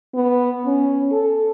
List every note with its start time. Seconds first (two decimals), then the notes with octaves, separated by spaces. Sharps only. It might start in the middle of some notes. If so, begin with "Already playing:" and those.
0.14 B3
0.66 C#4
1.12 A4